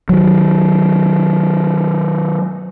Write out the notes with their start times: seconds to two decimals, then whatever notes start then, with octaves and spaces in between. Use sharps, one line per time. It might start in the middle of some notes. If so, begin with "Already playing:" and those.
0.09 D#3 F#3